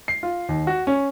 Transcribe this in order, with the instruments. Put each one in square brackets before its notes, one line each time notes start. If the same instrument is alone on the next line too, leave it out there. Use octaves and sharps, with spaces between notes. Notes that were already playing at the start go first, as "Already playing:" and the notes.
[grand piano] C7
F4
D#2
F#4
C#4